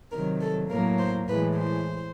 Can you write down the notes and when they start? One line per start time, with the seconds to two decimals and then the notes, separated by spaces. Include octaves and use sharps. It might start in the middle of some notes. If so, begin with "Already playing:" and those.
0.12 C3 D#3 F#3 A#4
0.40 A4
0.70 A2 F#3 A#3 A#4
0.99 C5
1.28 A2 E3 G#3 B4
1.56 C5